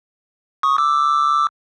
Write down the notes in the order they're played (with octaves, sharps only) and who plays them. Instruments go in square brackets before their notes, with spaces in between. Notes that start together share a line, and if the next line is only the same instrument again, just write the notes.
[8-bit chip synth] C#6 D#6
D6 E6